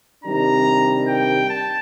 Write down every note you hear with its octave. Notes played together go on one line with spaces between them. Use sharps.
C3 D#3 G3 D4 A#5
G5
A5